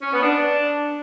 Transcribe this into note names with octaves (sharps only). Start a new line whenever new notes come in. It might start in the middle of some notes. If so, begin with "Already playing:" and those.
C#4
B3
D4